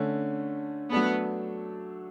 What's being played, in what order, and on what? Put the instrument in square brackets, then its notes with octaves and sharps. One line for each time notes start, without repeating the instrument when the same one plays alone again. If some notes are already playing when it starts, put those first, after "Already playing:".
Already playing: [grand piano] D3 A3 C#4
[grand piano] F#3 A3 D4 A4 [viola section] B3